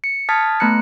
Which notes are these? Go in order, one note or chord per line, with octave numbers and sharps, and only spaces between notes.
C#7
A5 D#6 F6 G#6 A6 B6
A3 B3 A#5 F#6 C#7